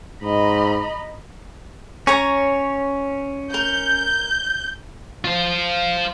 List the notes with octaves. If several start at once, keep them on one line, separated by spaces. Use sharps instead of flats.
G#2 D#5 A#5 B5
C#4 C#5 G#5 A#5
A#4 G6
F4 C5